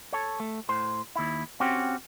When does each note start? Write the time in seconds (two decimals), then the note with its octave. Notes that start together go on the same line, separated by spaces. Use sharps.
0.13 A4 C#5
0.40 A3
0.69 A2 C5
1.16 D#2 E4
1.60 C4 C#4 F#4 G4